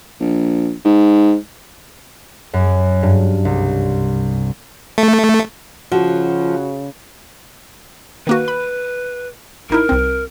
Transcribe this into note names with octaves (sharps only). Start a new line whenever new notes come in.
A#1
G#2
F#2
G2
C2
A3
C#3 F3 F#4
D#3 A#3 F#4 B4
B5
A1 D#4 E4 A#4
C2 C4